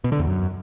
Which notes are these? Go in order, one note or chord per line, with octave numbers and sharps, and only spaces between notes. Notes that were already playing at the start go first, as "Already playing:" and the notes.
B2
D3
E2
F#2